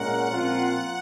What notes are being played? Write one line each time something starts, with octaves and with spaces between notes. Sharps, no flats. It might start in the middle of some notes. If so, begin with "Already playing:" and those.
Already playing: A#2 G#3 C#4 F4 A#4 F#5
A#2 F3 C4 F4 A#4